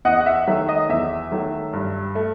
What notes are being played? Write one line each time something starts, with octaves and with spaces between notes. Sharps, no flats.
E2 D#5 F#5
F#5
E5
D#3 F#3 A3 E5
D#5
E2 E5
D#3 F#3 A3
G2
A3